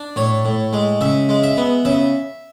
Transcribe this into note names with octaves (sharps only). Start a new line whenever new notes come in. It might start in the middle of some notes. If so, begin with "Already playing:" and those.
Already playing: D4
A2 C#5
A2
G#3
C#3 E5
G#3
E5
B3
C#3 E5